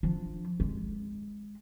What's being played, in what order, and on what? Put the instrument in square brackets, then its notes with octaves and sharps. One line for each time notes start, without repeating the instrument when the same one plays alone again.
[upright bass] F3 D4
G#3